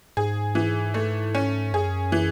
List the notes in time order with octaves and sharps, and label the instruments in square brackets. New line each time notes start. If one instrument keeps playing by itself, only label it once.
[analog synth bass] G#2 [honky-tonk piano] G#4
[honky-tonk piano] E3
A3
C#4
[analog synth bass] F#2 [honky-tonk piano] G#4
[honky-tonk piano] E3